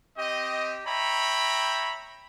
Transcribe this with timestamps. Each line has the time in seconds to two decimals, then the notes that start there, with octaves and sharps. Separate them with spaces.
0.18 C4 G4 D#5
0.87 C#5 E5 G5 A#5 B5